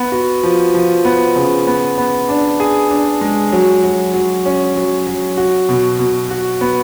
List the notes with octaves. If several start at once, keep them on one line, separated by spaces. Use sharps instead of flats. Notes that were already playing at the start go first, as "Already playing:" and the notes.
Already playing: B3
F#4
F3
F3
B3
C#3
B3
B3
D4
G#4
D4
G#3
F#3
F#3
F#3
C#4
F#3
F#3
F#4
B2
B2
F#4
B3